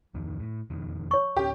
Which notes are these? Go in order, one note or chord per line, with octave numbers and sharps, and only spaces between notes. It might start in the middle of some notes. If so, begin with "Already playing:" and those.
D1 F2 D#3
A2
E1 F2 D#3
C#5 C#6
D1 C#4 G4